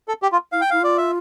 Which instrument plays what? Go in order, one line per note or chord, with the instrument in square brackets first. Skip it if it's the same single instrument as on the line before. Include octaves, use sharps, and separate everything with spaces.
[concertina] A4
G4
F4
[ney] E4 [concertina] F5
[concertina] G5
[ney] E4 [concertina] F5
[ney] F4 [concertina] D5
[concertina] E5